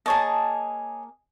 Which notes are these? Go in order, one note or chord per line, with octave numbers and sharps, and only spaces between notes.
A#3 G#4 C#5 D#5 A5